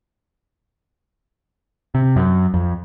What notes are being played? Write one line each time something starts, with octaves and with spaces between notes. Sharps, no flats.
C3
F#2
F2